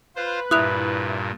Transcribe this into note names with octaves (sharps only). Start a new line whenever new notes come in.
F4 B4 C5
G2 A#2 E4 D#6 F#6 F7